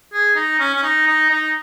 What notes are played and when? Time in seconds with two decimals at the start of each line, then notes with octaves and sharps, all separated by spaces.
0.13 G#4
0.35 D#4
0.59 C#4
0.75 C#4
0.83 D#4
1.07 D#4
1.30 D#4